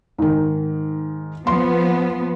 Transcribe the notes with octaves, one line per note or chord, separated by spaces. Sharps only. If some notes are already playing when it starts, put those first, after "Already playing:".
G#2 D#3
F3 B3 C6